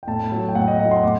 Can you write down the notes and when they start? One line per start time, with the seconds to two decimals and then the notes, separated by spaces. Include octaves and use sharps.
0.03 G5
0.07 A2 A5
0.32 F#3
0.49 G5
0.55 A2 F#5
0.68 D#5
0.79 F#3 F#5
0.91 C6
1.04 A2 D6